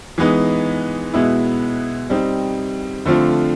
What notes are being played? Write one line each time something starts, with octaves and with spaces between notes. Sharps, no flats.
E3 G#3 B3 D#4
B2 G#3 B3 E4
G3 C4 D#4
D3 F3 A3 C4 F4